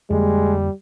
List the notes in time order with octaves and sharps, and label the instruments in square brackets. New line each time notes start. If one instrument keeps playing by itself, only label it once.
[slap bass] F2 D3 A#3 [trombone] G3 [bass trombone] G#3